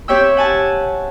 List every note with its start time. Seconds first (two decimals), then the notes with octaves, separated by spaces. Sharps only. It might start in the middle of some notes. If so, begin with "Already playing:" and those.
0.08 C4 G4 C#5 E5 G5 E6
0.37 F#5 G#5 A5